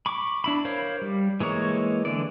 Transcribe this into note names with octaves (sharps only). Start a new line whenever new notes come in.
B5 C#6 D6
D4 E4 B5
A#4 C5 C#5 F5
G3
E3 G#3 A#3 C#5
D3 E3 D5